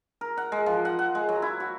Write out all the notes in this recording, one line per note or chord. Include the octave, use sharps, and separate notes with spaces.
A#4
F#5
G#3
F3
F#5
F#5
G#3
F#3
E4
F#4